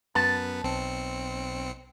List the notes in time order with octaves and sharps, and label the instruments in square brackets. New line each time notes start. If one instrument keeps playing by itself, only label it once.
[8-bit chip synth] F#2 B3 B4 [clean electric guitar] A5
[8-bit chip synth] B1 C4 C#7